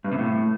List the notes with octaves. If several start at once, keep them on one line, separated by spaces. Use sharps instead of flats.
G2
C3
A2